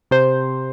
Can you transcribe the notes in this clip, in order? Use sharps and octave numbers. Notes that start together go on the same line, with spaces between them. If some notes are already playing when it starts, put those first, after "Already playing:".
C3 C5